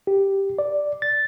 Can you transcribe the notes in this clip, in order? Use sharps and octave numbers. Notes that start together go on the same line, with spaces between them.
G4
D5
A6